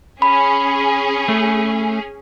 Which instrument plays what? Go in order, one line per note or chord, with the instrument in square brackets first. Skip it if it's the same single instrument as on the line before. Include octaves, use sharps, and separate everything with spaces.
[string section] C#4 G#4 [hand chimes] B5
[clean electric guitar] A3